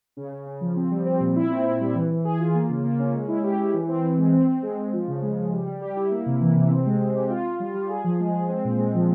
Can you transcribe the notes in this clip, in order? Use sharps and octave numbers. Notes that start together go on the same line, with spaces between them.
C#3
C#3
C#3
F3
C4
G3
C4
A#2
E4
C4
C4
G3
E3
E3
G#4
F4
A#3
C#3
A#3
C#4
G#3
E4
G4
E4
E3
C4
E3
G#3
C4
C4
G#3
G#3
F3
C#3
G#3
C#3
G3
G3
G4
E4
A#3
C3
E3
C3
C4
G#3
G#3
G4
F4
F4
G3
G3
G#4
F3
G#3
G#3
C4
A#2
G#3
F3